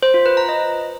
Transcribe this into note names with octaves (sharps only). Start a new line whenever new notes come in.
C5
F4
B4
A#5
D#5